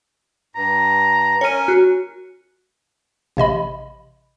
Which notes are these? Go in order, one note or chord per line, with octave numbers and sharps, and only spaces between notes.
G2 A#5
C#4 A#4 C#5 D#7
F#4
A1 C3 D#5 B5